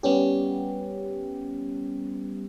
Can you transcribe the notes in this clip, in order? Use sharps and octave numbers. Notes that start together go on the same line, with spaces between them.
G3 B3 C#4 G4